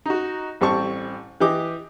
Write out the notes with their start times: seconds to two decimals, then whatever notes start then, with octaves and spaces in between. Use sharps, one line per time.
0.06 D#4 F#4
0.61 A1 G3 C4 A5 C#6
1.40 E3 G4 D#5 D6